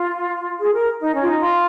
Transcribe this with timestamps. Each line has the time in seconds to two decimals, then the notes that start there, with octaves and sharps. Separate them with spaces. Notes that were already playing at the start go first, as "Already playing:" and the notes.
Already playing: F4
0.59 G#4
0.73 A#4
1.00 D#4
1.13 C#4
1.22 F4
1.26 D#4
1.40 F4